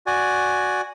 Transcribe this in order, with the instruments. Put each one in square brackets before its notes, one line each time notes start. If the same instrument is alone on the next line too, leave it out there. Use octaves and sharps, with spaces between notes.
[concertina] F#4 D5 G#5